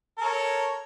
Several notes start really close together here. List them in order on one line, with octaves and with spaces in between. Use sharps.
A#4 A4 C#5